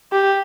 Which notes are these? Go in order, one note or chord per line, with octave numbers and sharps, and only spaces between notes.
G4